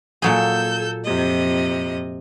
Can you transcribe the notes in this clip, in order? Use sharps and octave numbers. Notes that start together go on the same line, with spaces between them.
A#2 F#3 G#4 A4 E6 G6
F2 C3 D#5